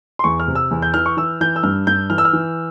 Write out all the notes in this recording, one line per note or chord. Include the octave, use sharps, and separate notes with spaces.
C6
E2 C#6
F6
C3
E6
E2
G6
E3 F6
C#6
E3 E6
E3 G6
E6
G2 F6
G2 G6
E3 F6
E6
F6
E3